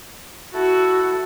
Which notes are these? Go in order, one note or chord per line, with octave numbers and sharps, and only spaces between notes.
E4 F#4 A4